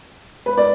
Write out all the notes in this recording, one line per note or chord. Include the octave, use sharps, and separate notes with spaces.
B4
D5